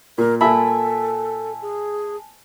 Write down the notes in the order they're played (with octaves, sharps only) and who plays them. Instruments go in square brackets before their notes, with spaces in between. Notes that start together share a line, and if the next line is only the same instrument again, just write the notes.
[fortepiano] A#2 [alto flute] A#4
[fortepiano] A#2 E5 B5 [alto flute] A4 [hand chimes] G#5 A5
[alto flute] G#4